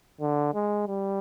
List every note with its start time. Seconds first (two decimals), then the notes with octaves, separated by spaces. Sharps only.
0.21 D3
0.55 G#3
0.88 G3